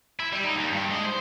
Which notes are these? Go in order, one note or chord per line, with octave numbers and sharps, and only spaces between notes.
E4
G3
D#4
D#2
G2
G#3
C5